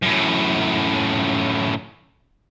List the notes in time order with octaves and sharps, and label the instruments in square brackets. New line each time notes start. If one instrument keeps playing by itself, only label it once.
[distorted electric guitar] F#2 A2